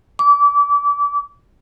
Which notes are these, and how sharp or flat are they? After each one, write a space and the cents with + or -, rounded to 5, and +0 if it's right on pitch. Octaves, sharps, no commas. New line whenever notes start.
D6 -30